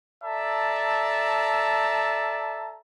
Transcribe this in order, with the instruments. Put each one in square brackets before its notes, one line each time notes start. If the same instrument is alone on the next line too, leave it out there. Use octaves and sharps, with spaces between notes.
[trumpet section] A4 D5 E5 A5 A#5